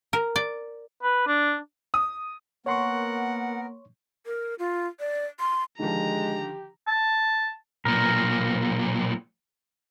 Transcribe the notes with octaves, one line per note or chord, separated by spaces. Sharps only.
A#4
D5
B4
D4
D#6
A#3 B3 A#4 C#5 F#5 C6 C#6
A#4
F4
D5
C6
D3 D#3 F3 G#3 G4 A#5
A5
B1 A#2 A#4